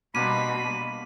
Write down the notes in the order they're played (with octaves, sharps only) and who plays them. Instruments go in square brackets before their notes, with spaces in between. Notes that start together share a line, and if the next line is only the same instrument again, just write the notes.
[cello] B2 G3 [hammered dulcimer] A#3 D4 C6 [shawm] B5 [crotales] D#7